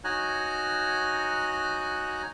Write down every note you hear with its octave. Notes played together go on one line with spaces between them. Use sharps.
D#4 F#4 C#5 G#5 A#5 F#6